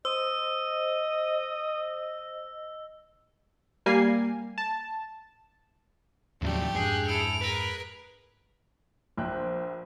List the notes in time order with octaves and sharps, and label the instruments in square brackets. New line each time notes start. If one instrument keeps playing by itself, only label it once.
[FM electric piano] C5 [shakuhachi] D#5 [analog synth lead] D#6 [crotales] E6
[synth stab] G3 A#3 G#5 C7
A5
[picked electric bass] D#2 C#3 F#3 [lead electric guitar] A2 F3 [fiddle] A3 G4 [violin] D5
[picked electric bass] F2 G#2 D4 [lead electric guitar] G#4 [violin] F#6 G6
[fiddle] E4 A4 [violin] D7 F7
[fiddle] G#4 A#4 [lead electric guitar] B4
[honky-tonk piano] A#1 G5 F#6 [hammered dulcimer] C5